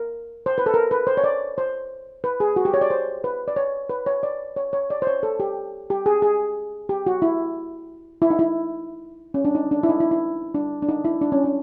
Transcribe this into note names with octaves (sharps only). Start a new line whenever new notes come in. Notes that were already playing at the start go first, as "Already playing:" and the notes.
Already playing: A#4
C5
B4
A4
A#4
B4
C5
C#5
D5
C5
B4
G#4
F#4
G4
C#5
D5
C5
B4
D5
C#5
B4
C#5
D5
C#5
C#5
D5
C5
C#5
A4
G4
G4
G#4
G#4
G4
F#4
E4
E4
D#4
E4
C#4
D4
D#4
D4
E4
D#4
E4
E4
D4
D4
D#4
E4
D4
C#4
D4